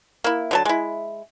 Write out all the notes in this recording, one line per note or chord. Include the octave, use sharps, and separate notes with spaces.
A#3 E4
D3 F#3 A5
G#3 E4